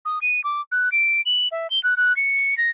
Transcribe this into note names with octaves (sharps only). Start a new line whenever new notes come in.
D#6
D#7
D6
F#6
D7
F#7
E5
G7
F#6
F#6
C#7
A#6